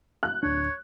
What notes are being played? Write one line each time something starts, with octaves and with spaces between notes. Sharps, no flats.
F#6
D1 D4 C#5